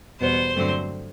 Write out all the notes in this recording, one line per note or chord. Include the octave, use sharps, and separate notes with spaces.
E2 B2 G3 B3 C5
G2 D3 F#3 A3 C4